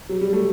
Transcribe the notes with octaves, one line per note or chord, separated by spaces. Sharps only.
F#3
G3
A3